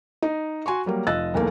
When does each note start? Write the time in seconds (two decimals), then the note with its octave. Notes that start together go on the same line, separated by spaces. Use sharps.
0.22 D#4 D#5
0.66 F#4 G#5 C6 C#6
0.86 F#3 G3 A#3
1.07 F1 F4 D#5 E6 F#6 A6
1.34 B1 E2 A3 A#3